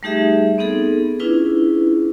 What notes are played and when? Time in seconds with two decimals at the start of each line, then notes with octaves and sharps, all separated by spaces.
0.03 G3 A3 D#4 G4 G#4 E5
0.58 B3 C4 D#4 G#4 A4
1.20 C#4 D4 E4 F4 G#4 B4